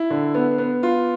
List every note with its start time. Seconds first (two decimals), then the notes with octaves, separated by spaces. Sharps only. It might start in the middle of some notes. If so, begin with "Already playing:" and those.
Already playing: E4
0.10 D3
0.34 B3
0.58 B3
0.83 F4